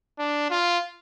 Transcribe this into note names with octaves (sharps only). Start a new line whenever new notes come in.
D4
F4